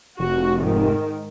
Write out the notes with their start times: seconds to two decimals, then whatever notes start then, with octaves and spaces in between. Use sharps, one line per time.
0.19 F1 F#4
0.59 G#2 D#3